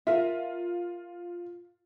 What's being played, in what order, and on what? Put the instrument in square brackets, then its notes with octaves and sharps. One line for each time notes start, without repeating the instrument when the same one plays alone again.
[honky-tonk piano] F4 [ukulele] A#4 E5